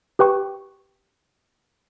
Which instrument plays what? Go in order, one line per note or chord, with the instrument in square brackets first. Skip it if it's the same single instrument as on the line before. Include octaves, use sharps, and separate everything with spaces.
[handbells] G4 B4 G5 C#6